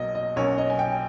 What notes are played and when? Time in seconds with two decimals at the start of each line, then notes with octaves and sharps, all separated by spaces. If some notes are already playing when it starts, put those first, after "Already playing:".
Already playing: B1 B2 A#3 D#5
0.15 D#5
0.36 B1 B2 A#3 C#4 C#5
0.58 D#5
0.70 G#5
0.79 G5